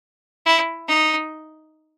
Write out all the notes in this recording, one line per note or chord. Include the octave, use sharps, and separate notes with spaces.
E4
D#4